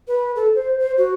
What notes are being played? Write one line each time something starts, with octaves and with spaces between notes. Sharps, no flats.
B4
A4
C5
C5
F#4